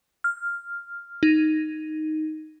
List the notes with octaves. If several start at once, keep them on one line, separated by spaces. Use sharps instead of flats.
F6
D#4